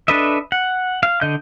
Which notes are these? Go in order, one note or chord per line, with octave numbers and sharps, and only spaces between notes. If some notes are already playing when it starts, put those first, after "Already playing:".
D4 A4 B4 D#5 E5
F#5
F5
D3 D#5 G6